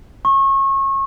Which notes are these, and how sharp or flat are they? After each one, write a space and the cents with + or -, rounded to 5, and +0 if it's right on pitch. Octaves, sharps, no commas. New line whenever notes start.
C#6 -30